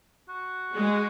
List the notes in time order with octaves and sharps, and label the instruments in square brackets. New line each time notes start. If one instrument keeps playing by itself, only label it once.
[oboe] F#4
[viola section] G#3